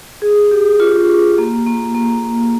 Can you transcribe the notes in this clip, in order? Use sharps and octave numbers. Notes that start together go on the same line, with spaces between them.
G#4
G4
F4
A#3
A#3
A#3